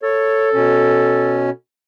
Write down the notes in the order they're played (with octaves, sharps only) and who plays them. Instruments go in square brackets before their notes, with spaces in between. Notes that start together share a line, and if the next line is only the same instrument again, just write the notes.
[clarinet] A4 [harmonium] C#5
[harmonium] B2 C#4